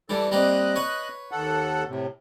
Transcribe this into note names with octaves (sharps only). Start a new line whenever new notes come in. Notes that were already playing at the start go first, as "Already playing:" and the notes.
E3 G3 A4 D5
G3 A#3 C4 D#5 F#6
B4 C#5
D#2 A4 F#5
A2 C3